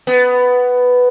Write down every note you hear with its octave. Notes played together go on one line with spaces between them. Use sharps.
B3